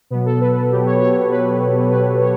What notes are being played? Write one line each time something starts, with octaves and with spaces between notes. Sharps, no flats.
B2 F#3 B3
A4
B4
A4
B2 F#3 G4
C#5
C#5
C#5
B2 F#3 B4
B2 F#3 B4
C#5